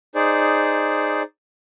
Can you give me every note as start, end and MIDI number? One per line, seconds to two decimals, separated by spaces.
0.15 1.23 63
0.15 1.23 68
0.15 1.23 72
0.15 1.23 74